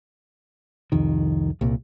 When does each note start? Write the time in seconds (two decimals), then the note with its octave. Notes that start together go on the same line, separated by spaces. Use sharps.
0.92 C2 F2 D#3
1.61 C2 A#2